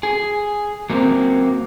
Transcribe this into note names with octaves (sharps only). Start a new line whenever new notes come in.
G#4
F#3 A#3 C4